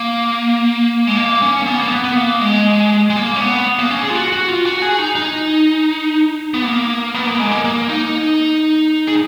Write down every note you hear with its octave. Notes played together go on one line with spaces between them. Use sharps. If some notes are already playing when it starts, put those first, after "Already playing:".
Already playing: A#3
G#3
A#3
C#4
A#3
B3
A#3
B3
B3
A#3
G#3
G#3
A#3
C#4
B3
A#3
C#4
G#4
F4
F#4
F#4
F4
F#4
G#4
D#4
D#4
B3
A#3
B3
A#3
G#3
A#3
A#3
D#4
G#4